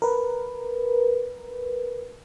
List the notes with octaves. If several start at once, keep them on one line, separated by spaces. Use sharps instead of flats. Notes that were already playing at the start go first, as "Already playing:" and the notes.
A#4 B4